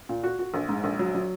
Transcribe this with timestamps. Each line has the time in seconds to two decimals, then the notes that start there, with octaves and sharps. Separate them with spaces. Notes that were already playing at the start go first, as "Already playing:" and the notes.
0.09 A#2
0.24 F#4
0.39 F#4
0.54 A#1
0.69 G#2
0.84 A#1
0.99 F#3
1.15 F#3